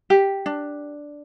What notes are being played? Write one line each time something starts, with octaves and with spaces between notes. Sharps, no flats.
G4
D4